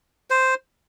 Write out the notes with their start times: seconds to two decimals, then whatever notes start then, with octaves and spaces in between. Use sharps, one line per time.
0.30 C5